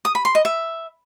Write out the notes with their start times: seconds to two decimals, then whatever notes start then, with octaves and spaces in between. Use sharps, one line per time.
0.05 D#6
0.15 B5
0.25 C6
0.35 D#5
0.45 E5